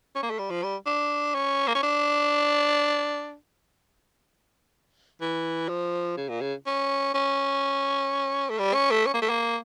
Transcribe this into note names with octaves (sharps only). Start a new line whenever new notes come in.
C#4
A#3
A3
G3
F3
G3
D4
C#4
A#3
C#4
D4
E3
F3
C#3
A#2
C#3
C#4
C#4
A3
G3
C#4
A3
C#4
A#3
A3
A#3